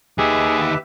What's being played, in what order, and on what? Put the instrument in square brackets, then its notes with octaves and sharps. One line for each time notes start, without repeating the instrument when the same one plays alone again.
[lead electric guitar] D#2 D#3 [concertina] G4 B4 E5 [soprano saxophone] G#4